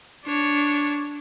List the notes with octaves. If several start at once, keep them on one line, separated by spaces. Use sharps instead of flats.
D4 C#5